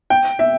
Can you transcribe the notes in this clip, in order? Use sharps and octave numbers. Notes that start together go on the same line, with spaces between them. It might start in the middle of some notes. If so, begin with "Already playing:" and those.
G5
E5